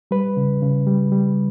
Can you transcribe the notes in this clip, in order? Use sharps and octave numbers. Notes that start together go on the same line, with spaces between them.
G3 B4
C#3
C#3
G3
G3